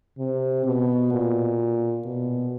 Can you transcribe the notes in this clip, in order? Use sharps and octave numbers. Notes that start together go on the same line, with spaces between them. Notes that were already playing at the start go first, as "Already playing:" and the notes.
C3
B2
A#2
B2